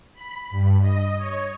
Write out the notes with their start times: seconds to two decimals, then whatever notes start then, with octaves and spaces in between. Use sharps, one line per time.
0.13 B5
0.50 G2
0.81 D#5
1.16 C#5